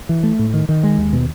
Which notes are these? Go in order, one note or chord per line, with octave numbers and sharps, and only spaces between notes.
E3
A3
A2
D#3
D#3
G#3
D#2
B2